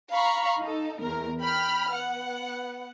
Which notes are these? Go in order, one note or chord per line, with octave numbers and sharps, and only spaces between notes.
F5 A#5 B5 C#6
D#4 A4
E2 A#4
G5 B5 F6
B3 F#5